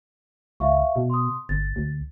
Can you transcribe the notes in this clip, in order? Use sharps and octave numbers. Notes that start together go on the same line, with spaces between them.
C#2 E5 F5 C#6
B2
C6 D#6
G1 A6
D2